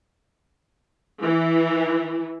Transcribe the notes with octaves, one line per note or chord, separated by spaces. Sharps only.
E3